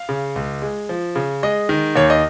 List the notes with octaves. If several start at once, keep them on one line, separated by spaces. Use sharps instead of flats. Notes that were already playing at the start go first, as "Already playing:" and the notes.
Already playing: F5
C#3
C#2
G#3
F3
C#3
G#3 D#5
D#3
D#2 C#5
D#5